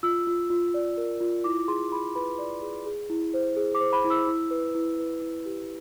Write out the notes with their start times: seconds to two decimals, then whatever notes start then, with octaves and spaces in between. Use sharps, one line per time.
0.03 F4 E6
0.27 F4
0.50 F4
0.74 D5
0.97 A#4
1.20 F4
1.44 E4 D6
1.68 G#4 C6
1.92 G#4 B5
2.15 B4 B5
2.39 D5
2.62 G#4
2.86 G#4
3.10 E4
3.34 C5
3.57 G#4
3.75 D6
3.80 C5
3.93 B5
4.04 E4
4.10 E6
4.27 E4
4.51 B4
4.75 E4
4.98 B4
5.22 E4
5.46 G4